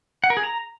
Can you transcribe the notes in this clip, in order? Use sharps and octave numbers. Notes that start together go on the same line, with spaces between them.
F#5
A#4
G#4
A#5